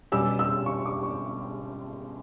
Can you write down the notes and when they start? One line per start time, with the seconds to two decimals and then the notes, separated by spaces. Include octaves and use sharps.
0.12 B2 G3 C#4 G4 E6
0.39 E6
0.66 C#6
0.86 D6
1.03 C#6